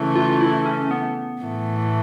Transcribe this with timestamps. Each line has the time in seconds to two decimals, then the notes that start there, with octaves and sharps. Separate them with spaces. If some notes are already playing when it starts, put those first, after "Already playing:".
Already playing: C#3 E3 A3
0.15 F4
0.41 E4
0.66 C#4
0.91 B3
1.41 A2 E3 A3